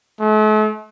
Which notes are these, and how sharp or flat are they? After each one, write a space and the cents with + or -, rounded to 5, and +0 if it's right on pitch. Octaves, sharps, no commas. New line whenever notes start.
A3 -45